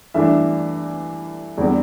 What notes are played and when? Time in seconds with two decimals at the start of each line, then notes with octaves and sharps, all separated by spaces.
0.14 G2 E3 A3 D4 E5
1.58 E2 D3 G3 C4 D5